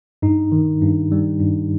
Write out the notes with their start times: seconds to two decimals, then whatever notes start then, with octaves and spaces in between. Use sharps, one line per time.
0.22 G2 D#4
0.52 D#3
0.82 G2
1.12 G3
1.40 G2